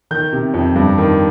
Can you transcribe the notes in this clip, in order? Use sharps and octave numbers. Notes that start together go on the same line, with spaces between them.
D#3 G6
C3
F2
G2
D#3